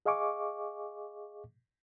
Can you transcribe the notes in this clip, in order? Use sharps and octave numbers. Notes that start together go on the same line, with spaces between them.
G#4 D#5 F5 G#5 C#6 D6